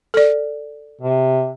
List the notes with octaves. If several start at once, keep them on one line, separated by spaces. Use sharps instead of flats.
A4 D5
C3